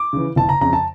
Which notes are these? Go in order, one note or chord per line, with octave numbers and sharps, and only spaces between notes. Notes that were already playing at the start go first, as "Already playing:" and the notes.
Already playing: D6
C#3 E3
F#1 A5
A#5
F2 C#3 A#5
A5